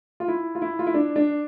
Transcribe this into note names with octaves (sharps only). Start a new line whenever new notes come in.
F4
E4
F4
E4
F4
E4
D4
D4